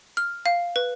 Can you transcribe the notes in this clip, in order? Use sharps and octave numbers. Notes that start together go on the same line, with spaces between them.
F6
F5
B4